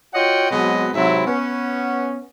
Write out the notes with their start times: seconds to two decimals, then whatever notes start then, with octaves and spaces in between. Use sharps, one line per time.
0.14 F4 F#4 C#5 D#5 F#5 G5
0.50 B2 F#3 G#3 C4 B4 D#5
0.93 G#2 C3 F#3 C4 E4
1.25 B3 C#4